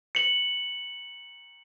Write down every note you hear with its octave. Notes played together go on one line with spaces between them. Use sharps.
C#7 F#7